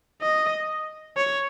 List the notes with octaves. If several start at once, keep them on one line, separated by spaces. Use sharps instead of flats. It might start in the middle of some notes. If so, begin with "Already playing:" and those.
D#5
C#5